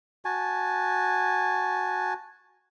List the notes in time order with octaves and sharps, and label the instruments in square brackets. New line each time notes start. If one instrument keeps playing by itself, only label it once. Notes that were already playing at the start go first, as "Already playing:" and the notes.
[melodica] F#4 G#5 A5